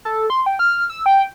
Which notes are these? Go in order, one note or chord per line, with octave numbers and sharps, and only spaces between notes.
A4
C6
G5
F6
E6
G5